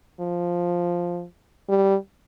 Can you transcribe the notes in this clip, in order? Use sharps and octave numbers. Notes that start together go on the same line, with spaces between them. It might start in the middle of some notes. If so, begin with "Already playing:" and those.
F3
G3